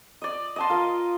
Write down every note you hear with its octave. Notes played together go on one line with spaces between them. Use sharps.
D5 D#5
D#5 A5 C6
F4 A#4 F5